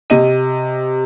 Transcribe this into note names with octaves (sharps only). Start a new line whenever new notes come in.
C3 D#5 D#7